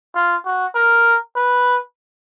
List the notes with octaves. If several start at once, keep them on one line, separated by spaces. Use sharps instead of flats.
F4
F#4
A#4
B4